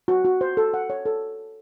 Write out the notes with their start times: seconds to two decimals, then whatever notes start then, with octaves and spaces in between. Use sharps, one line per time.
0.08 F#4
0.25 F#4
0.41 C5
0.57 A4
0.74 F#5
0.90 C#5
1.06 A4